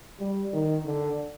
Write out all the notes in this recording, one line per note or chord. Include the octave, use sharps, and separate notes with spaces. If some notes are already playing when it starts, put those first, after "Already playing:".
G3
D#3
D3